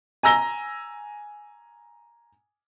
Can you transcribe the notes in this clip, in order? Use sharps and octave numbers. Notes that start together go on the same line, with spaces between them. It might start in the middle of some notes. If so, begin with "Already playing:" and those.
G#5 A#5 E6 A#6 G7